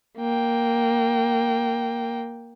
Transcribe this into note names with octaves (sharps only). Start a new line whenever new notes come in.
A#3 G5